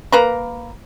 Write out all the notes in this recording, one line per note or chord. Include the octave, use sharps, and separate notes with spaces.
A#3 B4 A#5